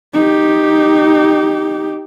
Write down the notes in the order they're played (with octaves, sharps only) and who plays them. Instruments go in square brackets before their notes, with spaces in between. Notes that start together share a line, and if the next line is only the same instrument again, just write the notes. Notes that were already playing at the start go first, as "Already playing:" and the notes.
[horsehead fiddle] D#4 G4